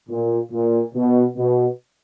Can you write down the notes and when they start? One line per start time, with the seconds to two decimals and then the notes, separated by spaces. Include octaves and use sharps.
0.09 A#2
0.52 A#2
0.95 B2
1.37 B2